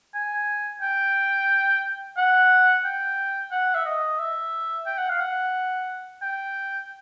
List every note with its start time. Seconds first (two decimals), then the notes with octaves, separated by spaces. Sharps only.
0.14 G#5
0.82 G5
2.17 F#5
2.84 G5
3.51 F#5
3.74 E5
3.85 D#5
4.19 E5
4.86 G5
4.98 F#5
5.09 F5
5.20 F#5
6.22 G5